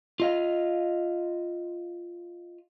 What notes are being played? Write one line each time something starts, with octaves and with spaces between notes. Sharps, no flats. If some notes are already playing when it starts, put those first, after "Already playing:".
F4 D#5 F5